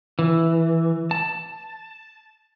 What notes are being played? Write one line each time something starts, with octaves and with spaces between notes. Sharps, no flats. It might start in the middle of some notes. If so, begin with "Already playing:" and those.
E3
A5